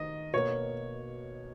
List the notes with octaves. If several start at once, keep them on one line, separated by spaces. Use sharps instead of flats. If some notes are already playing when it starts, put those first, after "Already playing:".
Already playing: D#3 D#5
B2 A#3 C#5